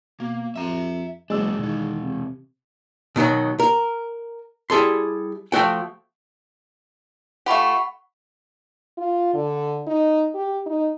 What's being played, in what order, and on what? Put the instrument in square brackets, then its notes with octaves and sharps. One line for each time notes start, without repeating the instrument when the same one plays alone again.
[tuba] B2 [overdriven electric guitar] A#3
[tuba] F2 [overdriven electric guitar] E5 A#5
[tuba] F#1 [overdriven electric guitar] E2 D4 [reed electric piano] G#3 E6
[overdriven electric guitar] B2 E3 [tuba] D#3
[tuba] C3
[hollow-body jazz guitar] B2 D#3 F3 F#3
A#4
G3 E4 G#4 A4 C6
F3 A3 F#4 G5
[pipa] A3 F4 G4 [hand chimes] F#5 B5 C#6
[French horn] F4
D3
D#4
G4
D#4